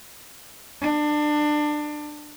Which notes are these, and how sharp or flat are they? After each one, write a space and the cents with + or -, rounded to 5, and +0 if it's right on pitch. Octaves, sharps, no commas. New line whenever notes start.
D4 +25